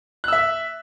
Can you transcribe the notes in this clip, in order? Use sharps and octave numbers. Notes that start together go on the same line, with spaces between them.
E5 E6 F#6